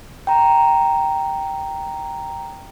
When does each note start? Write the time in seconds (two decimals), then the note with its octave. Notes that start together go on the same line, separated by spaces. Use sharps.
0.27 G5 A#5